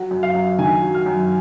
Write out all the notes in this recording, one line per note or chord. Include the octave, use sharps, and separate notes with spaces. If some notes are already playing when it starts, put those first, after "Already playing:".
Already playing: F#3 F#5
F#2
F5
F#2
D#3 G#5
F#3
F6
F#2